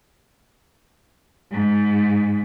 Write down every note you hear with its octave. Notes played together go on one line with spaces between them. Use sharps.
G#2